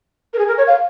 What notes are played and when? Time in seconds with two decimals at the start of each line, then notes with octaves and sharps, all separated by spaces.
0.34 A#4
0.39 G#4
0.48 A#4
0.58 C#5
0.67 F5